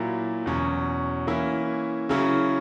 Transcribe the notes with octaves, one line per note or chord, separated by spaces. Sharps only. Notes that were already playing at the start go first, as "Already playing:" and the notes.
Already playing: A#2 F#3 A#3 E4
E2 B2 F#3 C#4
E3 A#3 C#4 E4
C#3 F#3 C#4 E4